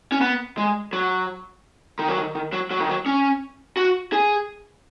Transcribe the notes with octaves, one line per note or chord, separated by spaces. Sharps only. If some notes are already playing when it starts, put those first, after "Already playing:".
C#4
B3
G#3
F#3
D#3
F#3
D#3
D#3
F#3
F#3
D#3
F#3
C#4
F#4
G#4